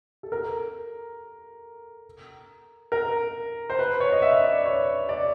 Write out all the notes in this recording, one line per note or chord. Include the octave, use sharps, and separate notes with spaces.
A4
A#4
A#4
C5
B4
C#5
D#5
E5
D5
C#5
D5